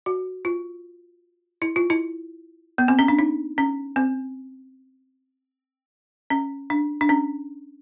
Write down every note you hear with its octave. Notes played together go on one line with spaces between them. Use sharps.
F#4
F4
E4
F4
E4
B3
C4
C#4
D4
D#4
C#4
C4
C#4
D4
D4
C#4